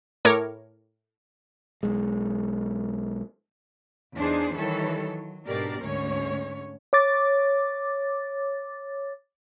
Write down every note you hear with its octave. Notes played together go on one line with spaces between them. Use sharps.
A2 A#4 C#5 D6 G#6
B1 G#3
E2 D4 D#4 G#4 C5
D#3 E3 G3 A4 C#5
F#3
G#2 B2 D4 G4 A#4 D5
D2 G#2 D3 C#4 C#5
C#5 D6 A6